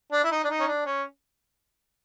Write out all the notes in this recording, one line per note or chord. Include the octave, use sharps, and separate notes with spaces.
D4
E4
D#4
D4
D#4
C#4
D4
C#4